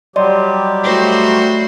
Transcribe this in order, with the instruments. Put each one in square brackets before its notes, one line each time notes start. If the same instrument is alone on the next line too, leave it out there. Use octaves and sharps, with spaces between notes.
[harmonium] F#3 G3 G4 [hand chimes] D5 D#5 C6
[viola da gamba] A3 F#4 C5